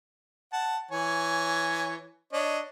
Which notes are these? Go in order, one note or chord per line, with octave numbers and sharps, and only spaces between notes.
F#5 A5
E3 C#5 G#5
D4 C#5 D#5